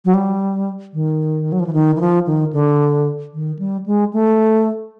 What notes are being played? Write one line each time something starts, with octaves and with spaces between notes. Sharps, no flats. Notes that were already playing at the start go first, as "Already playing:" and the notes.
F#3
G3
D#3
F#3
F3
E3
D#3
E3
F3
D#3
D3
D#3
G3
G#3
A3